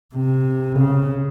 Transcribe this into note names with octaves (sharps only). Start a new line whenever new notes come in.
C3
C#3